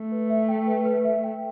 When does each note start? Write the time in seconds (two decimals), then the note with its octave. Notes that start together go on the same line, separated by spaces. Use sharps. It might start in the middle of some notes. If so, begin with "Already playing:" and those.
Already playing: A3
0.12 B4
0.30 E5
0.49 G5
0.67 B4
0.85 B4
1.05 E5
1.24 G5